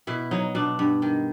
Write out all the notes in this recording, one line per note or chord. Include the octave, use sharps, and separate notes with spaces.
B2 E4
F#3 D#4
B2 D4
G2
D#3